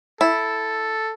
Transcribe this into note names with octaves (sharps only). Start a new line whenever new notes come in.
E4 A4